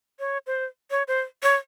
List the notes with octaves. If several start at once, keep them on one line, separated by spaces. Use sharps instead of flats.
C#5
C5
C#5
C5
C#5